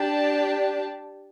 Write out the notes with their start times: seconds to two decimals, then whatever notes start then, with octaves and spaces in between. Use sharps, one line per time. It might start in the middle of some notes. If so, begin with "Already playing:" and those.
Already playing: D4 G4 D5 A5